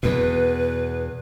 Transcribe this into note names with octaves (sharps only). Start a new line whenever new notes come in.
E2 B2 B4